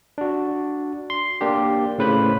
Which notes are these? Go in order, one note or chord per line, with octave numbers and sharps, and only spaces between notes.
D4 F#4
C6
A#3 D4 G4
A2 C#3 B4 C5 B5